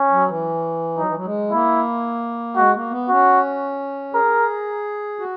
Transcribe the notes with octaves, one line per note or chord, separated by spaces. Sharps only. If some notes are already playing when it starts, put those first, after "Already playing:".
Already playing: C#4
F#3
E3
F#3 D#4
E3
F#3
G#3
A#3 E4
G#3 F#4
A#3
B3
C#4 F#4
G#4 A#4
F#4